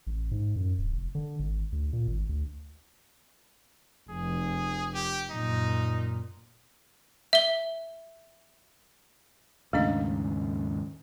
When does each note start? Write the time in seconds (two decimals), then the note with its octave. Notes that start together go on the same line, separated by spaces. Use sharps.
0.07 A1
0.31 G#2
0.56 F#2
0.78 D1
0.92 F1
1.15 D3
1.39 G#1
1.72 D2
1.93 A#2
2.07 G#1
2.29 D2
4.10 F1 G#4
4.95 G4
5.31 F#1 A#2 D#4
7.33 E5 G7
9.73 D#2 G#2 C#3 A3 D4 D#5